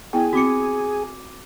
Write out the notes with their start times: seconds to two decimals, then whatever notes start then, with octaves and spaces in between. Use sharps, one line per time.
0.13 B3 E4 G#4 G5
0.33 C4 F#4 D6 C#7